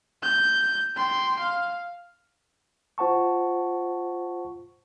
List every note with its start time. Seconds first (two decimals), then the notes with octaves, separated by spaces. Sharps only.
0.23 G6
0.96 G5 C6
1.40 F5
2.98 F4 C5 F#5 A5 C#6